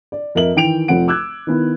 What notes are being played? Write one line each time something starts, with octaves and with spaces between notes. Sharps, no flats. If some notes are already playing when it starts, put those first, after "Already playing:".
D5
F2 A#4 D#5 E5 F#7
D#3 E3 G5 D7 F7
F1 F3 C4 F#5 D7
D6 E6 F#6 G#6
D#3 B3 E4